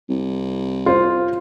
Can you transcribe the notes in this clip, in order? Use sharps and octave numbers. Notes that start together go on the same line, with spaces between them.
C2
F4 C5